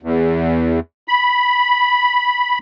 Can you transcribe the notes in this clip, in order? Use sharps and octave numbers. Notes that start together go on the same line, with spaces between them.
E2
B5